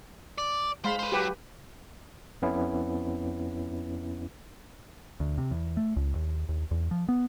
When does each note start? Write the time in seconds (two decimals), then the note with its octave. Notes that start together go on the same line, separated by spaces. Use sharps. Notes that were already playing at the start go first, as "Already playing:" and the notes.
0.38 D5
0.85 G#3 C5 F5 B5
0.99 B4 C5
1.12 F#3 G4 B4
2.42 F2 B3 C#4 E4
5.20 D2
5.38 C3
5.51 E2
5.77 A3
5.96 C#2
6.15 D#2
6.49 D#2
6.71 E2
6.91 F3
7.09 B3